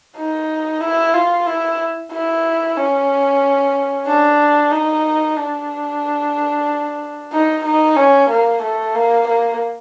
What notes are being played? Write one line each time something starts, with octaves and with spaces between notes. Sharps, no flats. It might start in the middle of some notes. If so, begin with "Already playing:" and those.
D#4
E4
F4
E4
E4
C#4
D4
D#4
D4
D#4
D#4
C#4
A#3
A3
A#3
A#3